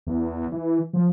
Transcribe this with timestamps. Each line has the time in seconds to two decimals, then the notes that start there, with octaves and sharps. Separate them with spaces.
0.07 E2
0.52 E3
0.93 F3